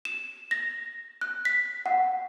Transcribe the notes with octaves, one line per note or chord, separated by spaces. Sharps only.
E7
A#6
F#6
B6
F#5